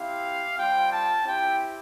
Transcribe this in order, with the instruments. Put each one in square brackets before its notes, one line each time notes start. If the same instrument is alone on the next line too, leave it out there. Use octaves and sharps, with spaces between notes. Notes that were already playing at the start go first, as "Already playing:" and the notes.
Already playing: [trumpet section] C4 E4 G4 F5
G3 C4 F4 G5
A5
C4 E4 G4 G5